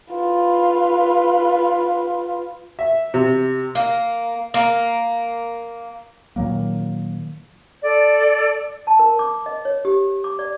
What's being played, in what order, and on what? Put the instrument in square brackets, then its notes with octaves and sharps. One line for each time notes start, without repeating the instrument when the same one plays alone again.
[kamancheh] F4 B4
[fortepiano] E5
C3
[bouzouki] A#3
A#3
[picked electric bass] A#2 D#3 F#3 A#3
[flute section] A4 D5
[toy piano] A5
A#4
D6
D#5
C#5
G4
D6
D5